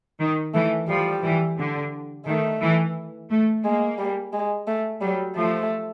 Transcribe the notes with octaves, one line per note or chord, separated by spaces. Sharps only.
D#3
E3 A3
F3 G3
E3
D3
D#3 A3
E3
A3
G#3 A#3
G3
G#3
A3
F#3 G3
F3 A3